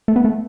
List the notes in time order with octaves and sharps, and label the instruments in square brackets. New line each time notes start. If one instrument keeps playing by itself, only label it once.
[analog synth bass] A3
B3
A3